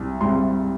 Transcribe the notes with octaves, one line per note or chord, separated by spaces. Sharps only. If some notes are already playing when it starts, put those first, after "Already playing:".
Already playing: C2
C3 G3 C6